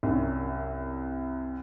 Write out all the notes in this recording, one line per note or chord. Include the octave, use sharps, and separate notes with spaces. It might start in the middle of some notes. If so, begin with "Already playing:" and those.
C2 F#2